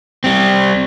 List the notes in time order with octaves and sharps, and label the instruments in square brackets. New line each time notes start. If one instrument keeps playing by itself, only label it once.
[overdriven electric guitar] G3 C4